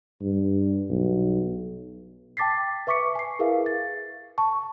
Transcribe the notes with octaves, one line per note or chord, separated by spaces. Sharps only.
G2
B1
G5 A5 D6 A6 B6 C7
B4 E5 C#6 D6 B6 C#7
G#5 C7
E4 G#4 A#4 B4 E5 F5
A6
A5 C#6